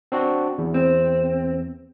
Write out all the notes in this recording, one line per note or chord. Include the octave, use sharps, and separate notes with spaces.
C4 D4 F#4
E2
C4